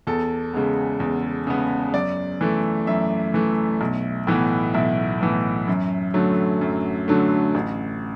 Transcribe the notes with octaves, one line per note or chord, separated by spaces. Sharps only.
E2 A4
C#3 G#3 B3
E2
C#3 G#3 B3
F#2 D5
E3 A3
F#2 E5
E3 A3
B1
A2 E3 B3
B1 E5
A2 E3 B3
F#2
D3 F#3 A3
F#2
D3 F#3 A3
A1